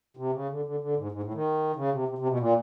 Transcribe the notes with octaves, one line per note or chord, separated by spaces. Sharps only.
C3
C#3
D3
D3
D3
G#2
G#2
A2
D#3
C#3
C3
C3
C3
B2
A#2